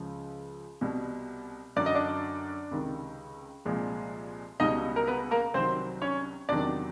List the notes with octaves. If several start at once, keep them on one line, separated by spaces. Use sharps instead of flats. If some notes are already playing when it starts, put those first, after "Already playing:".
Already playing: C#2 C#3 F3
C2 B2 G3
F#2 D3 F#3 D5
D#5
D4 D5
C#2 C3 D#3
C2 A#2 F3 G#3
C#2 B2 G3 D#4 D#5
A#4
B3 B4
A#3 A#4
C2 C3 D#3 F#3 C4 C5
C#4 C#5
E2 C3 D#3 F#3 D4 D5